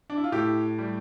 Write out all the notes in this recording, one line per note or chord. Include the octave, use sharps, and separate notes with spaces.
D4
E4
F4
A2 E4 G4
G3